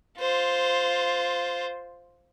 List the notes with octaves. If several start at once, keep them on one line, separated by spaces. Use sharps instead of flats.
F4 C5